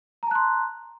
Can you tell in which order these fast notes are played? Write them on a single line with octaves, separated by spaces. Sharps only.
A#5 A5 F#6 C6